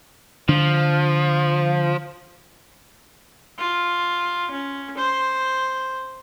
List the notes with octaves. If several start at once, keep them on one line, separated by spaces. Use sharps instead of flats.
D3 F3 D4
F4
C#4
C5